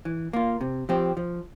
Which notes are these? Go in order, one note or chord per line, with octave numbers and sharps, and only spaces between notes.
E3
A#3 F4
C3
F3 C4 G4
F3